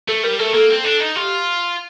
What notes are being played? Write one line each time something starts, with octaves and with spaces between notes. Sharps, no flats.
A3 A4
G3 A#4
A3 A4
A#3 A4
C4
D4
D#4
F4 G4